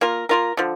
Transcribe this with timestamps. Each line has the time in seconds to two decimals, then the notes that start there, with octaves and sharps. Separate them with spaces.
0.01 A#3 F4 A#4
0.29 A#3 F4 A#4
0.57 D3 F3